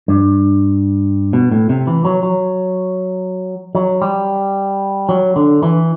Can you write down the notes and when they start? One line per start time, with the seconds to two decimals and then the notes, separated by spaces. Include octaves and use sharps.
0.08 G2
1.33 B2
1.51 A2
1.69 C3
1.87 E3
2.05 F#3
2.23 F#3
3.75 F#3
4.02 G3
5.09 F#3
5.36 D3
5.63 E3